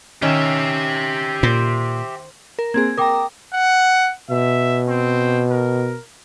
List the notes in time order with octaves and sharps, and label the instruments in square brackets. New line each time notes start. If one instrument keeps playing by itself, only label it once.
[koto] D#3 C#4 [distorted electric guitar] G4 E5
[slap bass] A#2 [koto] C5
[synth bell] A#4
[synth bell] A#3 C4 G#4 [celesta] G#6
[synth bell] A#4 A#5 [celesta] G5 D6 D#6
[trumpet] F#5
[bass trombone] B2 [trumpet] E5
[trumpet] C4
A#4